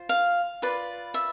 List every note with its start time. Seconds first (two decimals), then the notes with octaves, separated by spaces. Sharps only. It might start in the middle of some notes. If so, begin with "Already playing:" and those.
Already playing: F4 C5
0.09 F5
0.62 F4 B4 D5
1.14 E5